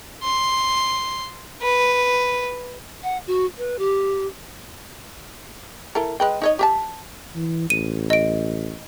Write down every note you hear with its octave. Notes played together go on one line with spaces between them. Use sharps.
C6
B4
F#5
F#4
B4
G4
E4 A4 A#4
G#3 B4 G5
D#4 C#5 D#5
G4 E5 A5
E3
A1 D#7
D#5 D7